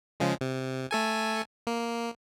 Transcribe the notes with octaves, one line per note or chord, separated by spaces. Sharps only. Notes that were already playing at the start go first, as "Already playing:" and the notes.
C#3 F3 G#3
C3
A3 A4 G#5
A#3